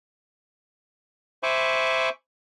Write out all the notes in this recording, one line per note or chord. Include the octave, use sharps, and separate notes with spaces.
C5 E5 G#5 B5 C#6 D6